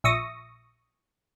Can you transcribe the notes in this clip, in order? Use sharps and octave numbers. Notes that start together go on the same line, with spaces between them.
A#1 E5 C#6 D#6 A#6